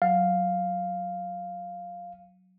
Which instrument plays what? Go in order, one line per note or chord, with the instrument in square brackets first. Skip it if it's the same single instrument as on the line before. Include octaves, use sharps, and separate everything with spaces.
[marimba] F#3 [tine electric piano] F5